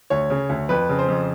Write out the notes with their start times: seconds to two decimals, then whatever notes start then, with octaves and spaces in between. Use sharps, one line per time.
0.10 D2 C#5
0.30 C#3
0.49 D2
0.69 F2 B4
0.89 C#3
0.99 C5
1.08 F2